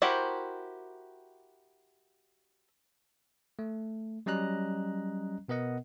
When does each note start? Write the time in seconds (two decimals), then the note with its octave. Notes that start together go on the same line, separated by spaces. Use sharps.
0.02 E4 F#4 G4 A#4 C5
3.59 A3
4.26 F#3 G3 C#4 D#5 A#5 F#6
5.48 B2 B3 A#4 D#5 F#5